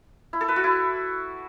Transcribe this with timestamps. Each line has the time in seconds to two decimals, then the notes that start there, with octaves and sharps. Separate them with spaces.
0.33 E4
0.41 A4
0.48 B4
0.56 F#4
0.64 E4